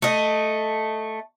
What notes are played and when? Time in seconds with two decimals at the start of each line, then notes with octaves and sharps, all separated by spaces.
0.02 A3 D#5